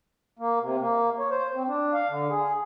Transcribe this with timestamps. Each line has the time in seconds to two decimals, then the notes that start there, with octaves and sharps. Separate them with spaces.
0.39 A#3
0.61 C3
0.80 A#3
1.19 C#5
1.31 C5
1.55 C4
1.68 D4
1.94 F5
2.09 D3
2.29 G#4